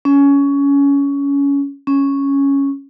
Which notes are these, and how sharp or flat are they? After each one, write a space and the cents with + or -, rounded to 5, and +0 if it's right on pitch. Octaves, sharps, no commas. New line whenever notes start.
C#4 +20
C#4 +0